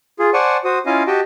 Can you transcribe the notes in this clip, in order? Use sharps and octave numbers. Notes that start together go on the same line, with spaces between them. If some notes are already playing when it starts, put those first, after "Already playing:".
F4 G#4
C5 D5 F#5 G#5 A5 C#6
F#4 C5 D#6
C#4 E4 F4 D#5 F5 G#5
F#4 G4 D#5 G5 A5